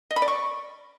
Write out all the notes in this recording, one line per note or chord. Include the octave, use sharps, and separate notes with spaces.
D#5
B5
D5
C#6